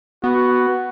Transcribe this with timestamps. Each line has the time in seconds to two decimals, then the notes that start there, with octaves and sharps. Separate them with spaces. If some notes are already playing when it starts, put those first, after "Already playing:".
0.24 B3 F#4